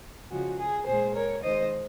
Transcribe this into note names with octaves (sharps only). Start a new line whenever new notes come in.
C#3 F3 G#3 F#4
G#4
A#2 G#3 G#4 C5
A#4 C#5
D#3 G#3 C5 D#5